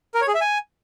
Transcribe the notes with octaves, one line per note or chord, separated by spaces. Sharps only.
A#4
C#5
G#4
E5
G#5